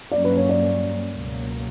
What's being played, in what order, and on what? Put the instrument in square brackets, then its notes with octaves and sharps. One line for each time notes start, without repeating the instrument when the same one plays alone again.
[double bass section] G2 F#3 A#3 C#4 [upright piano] D5
[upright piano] B4
C#5
D5
[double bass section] C#2 B2 F#3 A#3